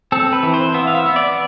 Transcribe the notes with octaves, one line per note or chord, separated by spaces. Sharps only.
C4 A4
B4
E3
C5
B3 E5
F5
E5
B3
D5